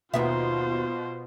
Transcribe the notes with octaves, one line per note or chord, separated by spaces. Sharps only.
D#2 B2 B3 F4 C5 E5